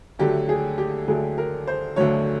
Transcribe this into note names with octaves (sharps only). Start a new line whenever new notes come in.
D2 D3 F#3 A3 G4
G#4
G4
D2 D3 F#3 A3 G#4
A#4
C5
D2 D3 F#3 A3 C#5